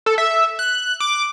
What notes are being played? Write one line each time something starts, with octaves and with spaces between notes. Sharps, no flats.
A4
E5
F#6
D6